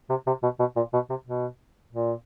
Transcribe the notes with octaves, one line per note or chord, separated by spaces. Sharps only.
C3
C3
B2
B2
A#2
B2
C3
B2
A#2